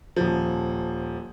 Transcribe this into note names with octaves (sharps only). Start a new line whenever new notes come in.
D#1 F3